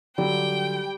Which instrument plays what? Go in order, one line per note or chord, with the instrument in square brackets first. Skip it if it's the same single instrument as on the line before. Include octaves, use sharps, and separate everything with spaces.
[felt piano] D3 F#3 [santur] G3 [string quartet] G5